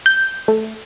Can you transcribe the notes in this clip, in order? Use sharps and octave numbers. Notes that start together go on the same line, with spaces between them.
G6
A3